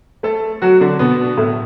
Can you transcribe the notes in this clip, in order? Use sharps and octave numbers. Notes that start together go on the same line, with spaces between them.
A3 A4
F#3 F#4
D3 D4
B2 B3
A2 A3